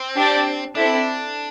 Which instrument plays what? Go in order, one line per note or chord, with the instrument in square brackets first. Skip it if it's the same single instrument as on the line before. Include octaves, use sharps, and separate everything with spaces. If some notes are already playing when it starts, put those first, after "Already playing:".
Already playing: [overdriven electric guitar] C4
[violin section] D4 G4 D5
[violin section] C4 E4 A4 [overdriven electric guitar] D4